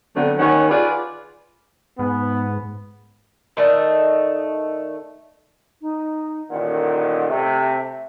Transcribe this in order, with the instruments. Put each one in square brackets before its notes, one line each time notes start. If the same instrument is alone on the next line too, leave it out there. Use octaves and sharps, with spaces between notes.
[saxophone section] D3 F#3 A3 B3 C4 D4
D#2 D#3 C#4 C#5 D#5 F#5
F4 G#4 B4 D5
[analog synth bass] G#2 [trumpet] B3
[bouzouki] D#3 A3 D4 D#5
[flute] D#4
[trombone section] A1 A#2 D#3 [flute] F#5
[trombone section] C3 A3 [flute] E5